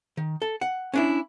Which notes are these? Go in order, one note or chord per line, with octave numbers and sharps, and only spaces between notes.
D#3
A4
F#5
C#4 D4 E4